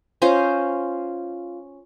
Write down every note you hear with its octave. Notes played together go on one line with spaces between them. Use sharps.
C#4 F4 C5 D#5